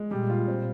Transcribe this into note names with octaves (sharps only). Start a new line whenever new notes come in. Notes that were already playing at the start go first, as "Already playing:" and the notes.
Already playing: G#3
A#2 G3
F4
C4